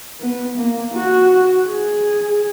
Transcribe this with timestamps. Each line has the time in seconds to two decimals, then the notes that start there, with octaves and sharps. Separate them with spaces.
0.21 B3
0.58 A#3
0.94 F#4
1.67 G#4